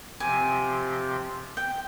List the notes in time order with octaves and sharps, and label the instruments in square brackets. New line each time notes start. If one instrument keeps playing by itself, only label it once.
[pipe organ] C3 F3 C4 G4 [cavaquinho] G#5
[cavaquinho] G5